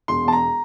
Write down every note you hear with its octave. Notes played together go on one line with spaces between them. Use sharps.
E1 C6
E2 A5
A#5